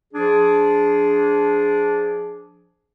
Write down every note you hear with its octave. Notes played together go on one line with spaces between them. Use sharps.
F3 D4 G#4